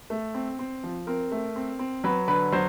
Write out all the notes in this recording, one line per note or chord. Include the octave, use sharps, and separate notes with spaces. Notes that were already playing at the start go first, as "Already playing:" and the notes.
A3
C4
C4
F3
C4 A#4
A3
C4
C4
F#3 B4
D3 B4
F#3 C5